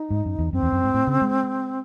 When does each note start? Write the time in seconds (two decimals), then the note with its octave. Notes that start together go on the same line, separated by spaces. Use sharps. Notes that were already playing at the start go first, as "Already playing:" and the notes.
Already playing: D#4
0.10 G#2
0.25 F#2
0.39 E2
0.52 F#2 C4
0.63 E2
0.72 F#2
0.84 G#2
0.94 A2
1.07 C#3
1.22 G#3